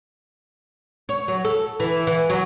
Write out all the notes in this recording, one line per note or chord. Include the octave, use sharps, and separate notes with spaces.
C#5
F#3
A4
E3
E3
F#3